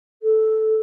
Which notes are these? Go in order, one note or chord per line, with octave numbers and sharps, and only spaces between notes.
A4